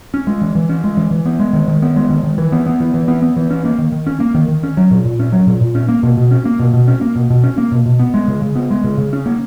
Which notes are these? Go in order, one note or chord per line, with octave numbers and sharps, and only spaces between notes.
C#4
G#3
E3
E3
C#4
G#3
E3
E3
B3
G#3
D#3
D#3
B3
G#3
D#3
D#3
E3
B3
B3
E3
E3
B3
B3
E3
C#4
A#3
D#3
D#3
C#4
A#3
D#3
D#3
C#4
F#3
A#2
A#2
C#4
F#3
A#2
A#2
C#4
A#3
B2
B2
C#4
A#3
B2
B2
C#4
A#3
B2
B2
C#4
A#3
B2
B2
B3
G#3
C#3
C#3
B3
G#3
C#3
C#3
C#4
A#3